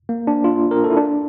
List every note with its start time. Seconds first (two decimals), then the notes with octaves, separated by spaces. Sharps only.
0.09 A#3
0.27 D4
0.44 F4
0.71 A#4
0.84 A4
0.90 E4
0.97 D4